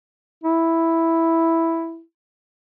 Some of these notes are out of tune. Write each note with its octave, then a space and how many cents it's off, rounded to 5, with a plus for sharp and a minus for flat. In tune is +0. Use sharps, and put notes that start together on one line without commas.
E4 +0